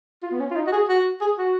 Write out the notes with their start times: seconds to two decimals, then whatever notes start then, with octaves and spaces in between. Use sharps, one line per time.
0.23 F4
0.31 B3
0.40 C#4
0.51 F4
0.56 D#4
0.67 F#4
0.72 G#4
0.89 F#4
1.21 G#4
1.38 F#4